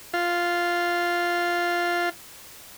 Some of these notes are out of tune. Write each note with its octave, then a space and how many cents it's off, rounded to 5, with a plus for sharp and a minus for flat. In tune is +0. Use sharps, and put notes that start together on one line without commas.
F4 +0